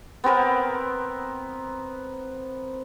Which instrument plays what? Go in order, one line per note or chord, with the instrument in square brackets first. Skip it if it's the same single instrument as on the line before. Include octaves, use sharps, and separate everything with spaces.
[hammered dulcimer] B3 C4 A#4 B4